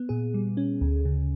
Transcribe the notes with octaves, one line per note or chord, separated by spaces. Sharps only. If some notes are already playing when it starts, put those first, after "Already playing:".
Already playing: B3
A#2 G#4
G3
C#4
D2
C#3